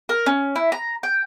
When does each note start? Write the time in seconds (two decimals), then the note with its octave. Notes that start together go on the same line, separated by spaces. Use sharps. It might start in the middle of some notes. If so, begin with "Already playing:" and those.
0.09 A#4
0.26 C#4
0.56 E4
0.72 A#5
1.03 G5